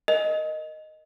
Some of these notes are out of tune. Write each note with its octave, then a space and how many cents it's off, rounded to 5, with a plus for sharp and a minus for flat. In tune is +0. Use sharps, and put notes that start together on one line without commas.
A#4 +0 D#5 -5